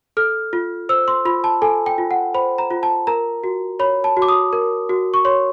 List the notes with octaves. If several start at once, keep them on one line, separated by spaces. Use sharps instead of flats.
A4 F6
F4
C5 E6
C6
F4 B5
A5
A4 G#5
G5
F4
F#5
C5 B5
A#5
F4
A5
A#4 A#5
F#4
C#5 B5
A5
F#4
D6
D#6
A#4
F#4
C#6
C#5 C6